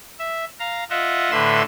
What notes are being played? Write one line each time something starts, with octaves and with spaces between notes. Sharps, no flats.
E5
F5 A#5
F4 D#5 E5 F#5
A2 D3 B4 E5 C6 E6